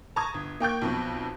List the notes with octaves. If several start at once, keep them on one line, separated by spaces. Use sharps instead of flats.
A5 A#5 C#6 D#6 G#6
G1
A#3 G5 C#6 G6
B1 F2 B2